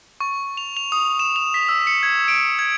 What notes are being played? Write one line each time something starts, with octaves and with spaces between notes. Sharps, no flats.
C#6
F7
F7
D#6
E7
F7
B6
E6
C#7
G#6
D7
G#6